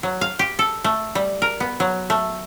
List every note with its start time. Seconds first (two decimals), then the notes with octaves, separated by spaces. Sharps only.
0.03 F#3
0.21 F5
0.39 G4
0.59 A4
0.84 A3
1.15 G3
1.42 A#4
1.60 B3
1.80 F#3
2.10 A3